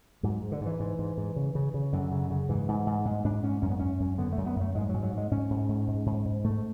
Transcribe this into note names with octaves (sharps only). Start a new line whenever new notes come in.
G#2 F#3
G#2
D3
G#2 E3
G#2
G#2
G#2
C#3
C#3
C#3
F#2 D3
C#3
C#3
G#2 E3
G#2
G#2
G#2 G#3
G#2 D4
G#2 C#4
F#2 C#4
B3
F#2 C#4
F#2
D3 B3
F#2 A3
B3
F#2 A3
G#2 G#3
G#2 F#3
F#3
G#2
G#3
G#2 C#4
G#2
G#2
G#2
G#2
G#2
G#2 A3